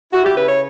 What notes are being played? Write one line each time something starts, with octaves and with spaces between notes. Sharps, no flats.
E4 F#4
G4
C#3 B4
C#5